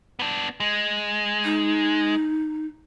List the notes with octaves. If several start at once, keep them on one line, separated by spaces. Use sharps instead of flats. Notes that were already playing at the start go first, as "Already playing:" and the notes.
B3 D4
G#3
D#4